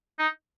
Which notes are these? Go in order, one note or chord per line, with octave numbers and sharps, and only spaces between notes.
D#4